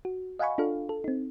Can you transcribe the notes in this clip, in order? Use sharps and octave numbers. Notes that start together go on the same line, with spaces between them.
F#4
D#5 F5 F#5 G#5 B5 C#6
D4 F4 A4 F5
A4
C4 D#4